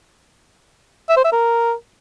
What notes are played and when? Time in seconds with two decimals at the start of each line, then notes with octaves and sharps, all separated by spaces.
1.09 E5
1.17 C5
1.24 E5
1.32 A#4